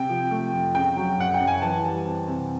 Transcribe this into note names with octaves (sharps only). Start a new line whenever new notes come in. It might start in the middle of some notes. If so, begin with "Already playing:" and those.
Already playing: C3 G5
F3
A3
F2
C#3 G5
F#3
F#2 F#5
G5
F#2
G#5
E3 A5
G3
C4
C3